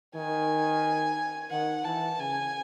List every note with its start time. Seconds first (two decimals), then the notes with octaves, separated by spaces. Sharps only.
0.15 D#3 G#5
1.51 D#3 F#5
1.84 E3 A5
2.19 C#3 G#5